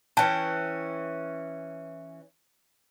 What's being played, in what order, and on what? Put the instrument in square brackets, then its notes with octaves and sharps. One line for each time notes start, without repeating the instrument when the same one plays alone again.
[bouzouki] E3 C#4 [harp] G5 [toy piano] A5